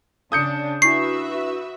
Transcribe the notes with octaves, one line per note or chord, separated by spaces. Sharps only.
C#3 D4 D#6 G6 C#7
D4 E4 F#4 B4 E5 C#6 C7